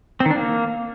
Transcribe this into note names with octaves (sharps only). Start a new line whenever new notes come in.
C4
D#3
D4
A#3